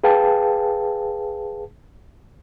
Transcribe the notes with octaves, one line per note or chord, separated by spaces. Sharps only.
G#4 B4 F5 G5 A5